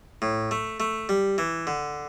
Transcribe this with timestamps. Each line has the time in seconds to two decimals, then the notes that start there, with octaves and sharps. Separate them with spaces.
0.22 A2
0.51 A3
0.80 A3
1.09 G3
1.38 E3
1.67 D3